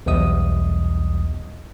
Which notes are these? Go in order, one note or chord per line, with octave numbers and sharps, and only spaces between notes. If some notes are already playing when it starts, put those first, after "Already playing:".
B1 E2 G3 D#5 D#6